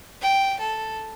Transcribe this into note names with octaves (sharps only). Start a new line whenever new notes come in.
G5
A4